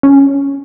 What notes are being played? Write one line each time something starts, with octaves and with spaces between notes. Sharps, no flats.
C#4